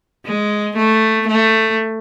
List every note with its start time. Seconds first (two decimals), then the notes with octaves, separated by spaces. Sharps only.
0.26 G#3
0.77 A3
1.28 A3